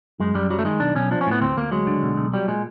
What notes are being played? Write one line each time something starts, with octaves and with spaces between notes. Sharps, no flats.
F#2 G#3
F#2 G3
F#3 G3
A3
D#3 G#3
B1 D4
B1 C#4
F3 D4
C#4
A2 B3
D2 C4
D2 A#3
F#3 G#3
D3
B1
B1
F#3 G3
A#2 G#3